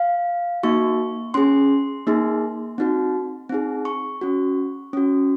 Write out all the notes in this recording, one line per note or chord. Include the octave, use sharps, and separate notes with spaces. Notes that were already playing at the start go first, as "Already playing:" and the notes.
Already playing: F5
A#3 D#4 F#4 C#6
C#4 G#4 C6
A#3 D#4 G#4
C4 D#4 F#4
C4 D#4 G#4
C#6
C#4 F#4
C#4 F#4